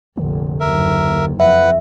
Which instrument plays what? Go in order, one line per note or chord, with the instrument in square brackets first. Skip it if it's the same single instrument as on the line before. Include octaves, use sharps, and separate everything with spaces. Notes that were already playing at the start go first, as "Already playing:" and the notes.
[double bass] F1 A#1 [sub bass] D3
[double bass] F#1 D#2 [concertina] A#4 E5
[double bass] F2 [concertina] B4 F#5 [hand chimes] E5